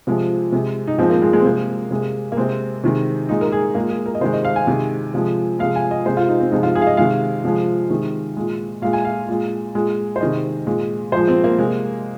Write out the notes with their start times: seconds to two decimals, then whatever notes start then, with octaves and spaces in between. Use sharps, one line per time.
0.07 C3 F3 G#3
0.52 C3 G#3
0.87 D#4
0.98 A#2 F3 G#3 C4
1.10 A#3
1.22 G#3
1.33 G#3
1.40 C4
1.45 C3 G#3 A#3
1.91 C3 G#3
2.32 A#3
2.37 C3 G#3 C4
2.84 C3 D#3 G#3
3.29 A#2 G#3 D#4
3.41 A#4
3.52 G#4
3.75 A#2 G#3 A#3
3.91 G#4
4.06 A#4
4.15 D#5
4.21 C3 D#3 G#3 C5
4.33 D#5
4.45 F5
4.56 G#5
4.67 C3 D#3 G#3
5.14 C3 F3 G#3
5.59 C3 F3 G#3 F5
5.76 G#5
5.91 D#5
6.05 C3 G#3 C5
6.17 F4
6.28 D#4
6.40 C4
6.52 C3 F3 G#3 D#4
6.63 F4
6.75 G#4
6.82 F5
6.87 D#5
6.97 C3 D#3 G#3 F5
7.44 C3 F3 G#3
7.90 C3 D#3 G#3
8.37 A#2 G#3
8.82 A#2 G#3 F5
8.93 G#5
9.05 F5
9.29 A#2 G#3
9.75 A#2 G#3
10.16 C5
10.21 C3 D#3 G#3 D#5
10.67 A#2 G#3
11.12 A#2 F3 G#3 C5
11.28 C4
11.44 A#3
11.58 C3 G#3